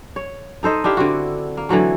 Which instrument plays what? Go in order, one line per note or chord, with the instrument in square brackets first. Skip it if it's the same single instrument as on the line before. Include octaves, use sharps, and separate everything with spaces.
[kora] C#5
D#4 A4 C5 D#5
D4 E4 G4 F5
D3 C4 F#4
A#3
D3 E3 F#3 A3